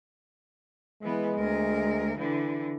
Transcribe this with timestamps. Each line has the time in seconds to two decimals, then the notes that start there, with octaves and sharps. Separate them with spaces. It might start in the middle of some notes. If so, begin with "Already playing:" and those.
1.02 E3 G#3 B3
1.37 D2 A#4
2.18 D3 E3